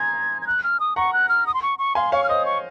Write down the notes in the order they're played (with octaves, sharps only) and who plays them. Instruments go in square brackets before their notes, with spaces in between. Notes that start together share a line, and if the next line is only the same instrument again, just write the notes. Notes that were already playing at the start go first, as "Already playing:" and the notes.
Already playing: [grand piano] G#5 A#5 C6 D#6 [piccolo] G#6
[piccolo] G#6
F#6
F6
D#6
[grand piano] F#5 A#5 [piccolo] C#6
[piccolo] F#6
F6
D#6
C6
C#6
C#6
[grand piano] F5 G#5 [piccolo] C6
[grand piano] C#5 F5 [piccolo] C#6
[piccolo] F6
[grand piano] C5 D#5 [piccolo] D#6
[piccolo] C#6